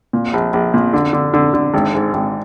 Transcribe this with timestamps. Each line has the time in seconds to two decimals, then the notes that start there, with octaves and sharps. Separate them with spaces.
0.13 A#2
0.33 A#1
0.53 A#1
0.74 A#2
0.93 D3
1.13 D3
1.34 D3
1.54 D3
1.74 G#1
1.94 G#2
2.14 G#1